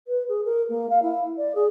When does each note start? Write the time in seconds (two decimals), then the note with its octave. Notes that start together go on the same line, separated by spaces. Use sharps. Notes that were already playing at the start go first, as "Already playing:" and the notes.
0.08 B4
0.28 G#4
0.45 A#4
0.69 A#3
0.89 F5
1.02 E4
1.38 D5
1.55 G#4